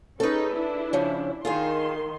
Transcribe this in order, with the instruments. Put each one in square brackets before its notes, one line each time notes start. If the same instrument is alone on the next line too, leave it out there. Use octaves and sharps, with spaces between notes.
[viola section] C#4 D#4 G#4 [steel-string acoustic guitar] A4 B4
[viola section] D4 E4
[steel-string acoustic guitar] C#3 F3 C#4
[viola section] D#3 C6 [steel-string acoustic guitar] F4 G#4 F5